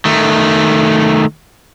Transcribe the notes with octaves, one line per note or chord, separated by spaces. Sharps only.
D#3 A3